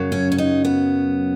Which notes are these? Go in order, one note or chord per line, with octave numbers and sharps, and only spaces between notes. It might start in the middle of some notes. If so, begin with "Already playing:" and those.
Already playing: F#2 C#3 F#3
C#4
C#4
D#4
B3